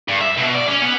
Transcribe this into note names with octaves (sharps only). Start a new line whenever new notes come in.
G2
E5
B2
D5
C#4
B3